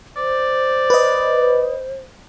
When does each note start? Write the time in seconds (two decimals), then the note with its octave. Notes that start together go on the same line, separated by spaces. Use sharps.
0.16 C5 D5
0.90 B4 D#5